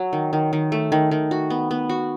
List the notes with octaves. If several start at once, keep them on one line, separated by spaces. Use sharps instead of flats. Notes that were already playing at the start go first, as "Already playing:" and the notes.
Already playing: F#3
D#3
D#3
D#3
A3
D#3
D#3
F#4
B3
B3
F#4